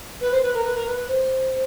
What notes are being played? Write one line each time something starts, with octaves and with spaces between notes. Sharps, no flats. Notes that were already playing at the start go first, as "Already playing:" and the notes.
B4
C5
B4
A#4
B4
A#4
B4
B4
C5